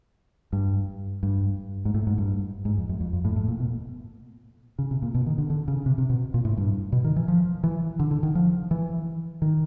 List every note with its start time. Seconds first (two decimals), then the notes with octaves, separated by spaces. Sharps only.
0.53 G2
1.23 G2
1.85 G#2
1.94 A2
2.07 G#2
2.18 G2
2.65 G#2
2.78 F2
2.89 F#2
3.01 F2
3.13 F2
3.25 A2
3.36 A2
3.48 A#2
3.60 B2
4.79 C#3
4.91 C3
5.02 A#2
5.14 B2
5.26 D#3
5.38 D3
5.50 D3
5.68 C#3
5.86 C3
5.98 C3
6.10 B2
6.34 A#2
6.45 A2
6.57 G2
6.92 B2
7.05 D#3
7.16 E3
7.28 F3
7.64 E3
8.00 D3
8.11 D3
8.23 D#3
8.35 F3
8.71 E3
9.42 D#3